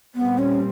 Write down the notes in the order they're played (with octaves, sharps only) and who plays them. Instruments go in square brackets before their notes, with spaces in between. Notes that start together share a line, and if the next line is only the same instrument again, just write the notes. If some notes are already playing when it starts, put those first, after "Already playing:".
[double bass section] A#2 G3 C4 [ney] B3
[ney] C#4